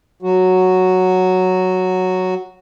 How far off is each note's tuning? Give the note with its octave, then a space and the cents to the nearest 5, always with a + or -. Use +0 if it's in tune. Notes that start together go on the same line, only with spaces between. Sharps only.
F#3 +0 F#4 +0